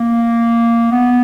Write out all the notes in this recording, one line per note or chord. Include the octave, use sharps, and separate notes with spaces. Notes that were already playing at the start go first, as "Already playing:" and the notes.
Already playing: A#3
B3